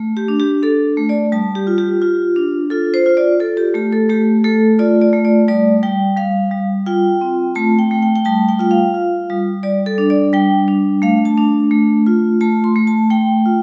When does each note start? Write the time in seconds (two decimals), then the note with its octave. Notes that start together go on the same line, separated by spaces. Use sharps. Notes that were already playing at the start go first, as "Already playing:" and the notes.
Already playing: A3
0.17 G4
0.28 D4
0.40 G4
0.63 D4 A4
0.97 A3
1.09 D5
1.32 G3 A5
1.55 G4
1.67 F4
1.78 G4
2.02 F4
2.36 D4
2.70 F4 A4
2.94 C5
3.06 F4
3.17 D5
3.40 F4 A4
3.57 G4
3.74 A3 G4
3.93 A4
4.09 A3 G4
4.44 A3 A4
4.79 F4 D5
5.01 D5
5.13 A3
5.25 D5
5.48 G3 D5
5.83 G3 G5
6.17 G3 F5
6.51 G3
6.86 F4 G5
7.21 C4
7.55 A3 A5
7.79 G5
7.91 A3
8.02 G5
8.16 G5
8.25 G3 A5
8.49 G5
8.59 F4 G5
8.71 F5
8.94 F4
9.30 G3
9.63 G3 D5
9.86 A4
9.98 D4
10.10 D5
10.33 G3 G5
10.68 D4
11.02 A3 F5
11.25 A5
11.38 D4
11.71 A3
12.06 F4
12.41 A3 A5
12.64 C6
12.76 A3
12.87 A5
13.10 A3 G5
13.46 F4